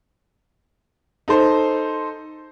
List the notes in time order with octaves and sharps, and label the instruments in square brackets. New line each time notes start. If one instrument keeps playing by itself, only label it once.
[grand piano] D#4 A4 C5